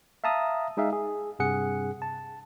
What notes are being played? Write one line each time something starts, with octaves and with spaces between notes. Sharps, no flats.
E5 F5 A5 A#5 D#6
G#3 D#4 G#4 E5 F5
G#4
G2 C3 G#4 F#5 C#7
A5